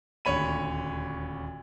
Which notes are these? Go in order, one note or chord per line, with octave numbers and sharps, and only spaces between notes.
D#1 D2 C#5 B5 D#7